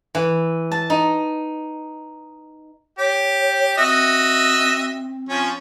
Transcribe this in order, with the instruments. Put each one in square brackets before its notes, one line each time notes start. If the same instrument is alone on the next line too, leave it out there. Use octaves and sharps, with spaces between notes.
[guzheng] E3
A5
D#4
[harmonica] G4 [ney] C#5
[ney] C4 [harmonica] F#4 D#5 E5
[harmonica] F3 C#4